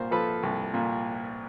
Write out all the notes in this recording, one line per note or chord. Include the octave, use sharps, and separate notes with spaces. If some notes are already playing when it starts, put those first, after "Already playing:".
Already playing: C2 A#2 A#4 C5
F3 A4 B4
C2
A#2